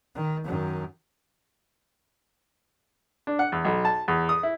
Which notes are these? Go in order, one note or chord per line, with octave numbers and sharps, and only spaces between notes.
D#3
F#2 D#3
D4
F#5
E2
B1
A5
E2
D#6
E4